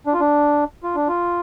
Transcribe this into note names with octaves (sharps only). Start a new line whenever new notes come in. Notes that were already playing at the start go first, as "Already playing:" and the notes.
D4
F4
D4
F4
D4
F4